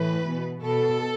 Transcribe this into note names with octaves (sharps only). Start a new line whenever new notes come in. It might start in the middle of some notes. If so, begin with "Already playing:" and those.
Already playing: A2 E3 B4
B2
B2 A4